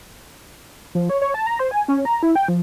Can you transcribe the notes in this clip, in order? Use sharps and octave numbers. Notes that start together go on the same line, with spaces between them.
F3
C#5
C#5
A5
A#5
C5
G#5
C#4
A#5
E4
G5
F3